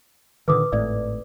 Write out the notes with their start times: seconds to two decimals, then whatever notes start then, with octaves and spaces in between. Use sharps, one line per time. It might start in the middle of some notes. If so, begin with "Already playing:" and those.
0.48 A#2 D3 D#3 B4 D6 D#6
0.72 G#1 A2 D5